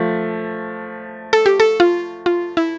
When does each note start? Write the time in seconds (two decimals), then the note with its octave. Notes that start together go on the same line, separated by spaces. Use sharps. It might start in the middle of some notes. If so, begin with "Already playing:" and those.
Already playing: F3 A3
1.33 A4
1.46 G4
1.60 A4
1.80 F4
2.26 F4
2.57 E4